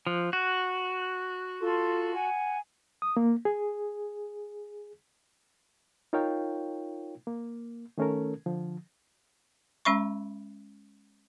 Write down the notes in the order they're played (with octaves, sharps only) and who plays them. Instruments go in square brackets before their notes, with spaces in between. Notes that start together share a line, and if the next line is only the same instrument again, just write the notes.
[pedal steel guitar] F3 [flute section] F#6
[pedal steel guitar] F#4
[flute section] F4 A4 C6
F#5 G#5
[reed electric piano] D#6
A#3
G#4
D#4 F4 A#4 C#5 F5 G5
A#3
D#3 A3 C#4 A4 A#4
D3 F3
[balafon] G#3 C#4 E5 B5 C#6